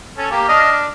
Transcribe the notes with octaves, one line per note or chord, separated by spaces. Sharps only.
C#4 A4
A#3 G4
D4 D#5 F6
D4